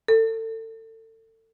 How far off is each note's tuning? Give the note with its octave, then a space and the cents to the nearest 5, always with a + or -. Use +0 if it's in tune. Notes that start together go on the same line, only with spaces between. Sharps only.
A4 +30